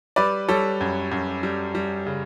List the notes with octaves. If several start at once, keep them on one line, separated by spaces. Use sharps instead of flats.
G3 B4 D5
G3 A4 C#5
F#2
F#2
G3
G3
C#3